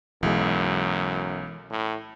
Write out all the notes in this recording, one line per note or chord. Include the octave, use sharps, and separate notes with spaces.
B1 F#2 E3 G#3
A2